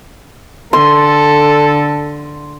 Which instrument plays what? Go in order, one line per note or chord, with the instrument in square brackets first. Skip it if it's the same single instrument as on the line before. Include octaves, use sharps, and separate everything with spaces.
[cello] D3 [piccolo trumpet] A4 [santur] C6